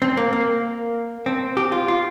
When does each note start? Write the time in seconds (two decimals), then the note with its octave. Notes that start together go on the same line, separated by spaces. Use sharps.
0.02 C4
0.17 A#3
0.33 A#3
1.26 C4
1.57 G4
1.72 F4
1.88 F4